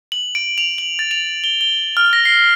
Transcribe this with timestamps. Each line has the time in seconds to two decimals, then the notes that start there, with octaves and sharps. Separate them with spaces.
0.12 F#7
0.35 D7
0.58 F7
0.78 F#7
0.99 A6
1.11 F7
1.44 G7
1.61 G7
1.97 F6
2.13 A#6
2.25 C7